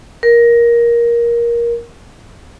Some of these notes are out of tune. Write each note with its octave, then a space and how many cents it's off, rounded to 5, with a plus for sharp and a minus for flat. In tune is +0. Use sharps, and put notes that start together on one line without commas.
A#4 +15